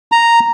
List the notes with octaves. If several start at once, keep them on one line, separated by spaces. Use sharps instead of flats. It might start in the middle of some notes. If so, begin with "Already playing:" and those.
A#5